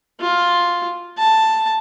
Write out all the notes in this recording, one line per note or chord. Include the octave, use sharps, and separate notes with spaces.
F4
A5